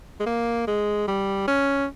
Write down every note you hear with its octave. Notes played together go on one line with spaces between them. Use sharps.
G#3
A#3
G#3
G3
C#4